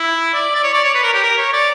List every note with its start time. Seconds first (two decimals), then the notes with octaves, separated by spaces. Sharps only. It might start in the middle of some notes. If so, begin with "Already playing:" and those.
Already playing: E4
0.34 D5
0.55 D5
0.64 C#5
0.73 D5
0.84 C#5
0.94 B4
1.03 A#4
1.14 G4
1.23 A#4
1.38 C#5
1.53 D5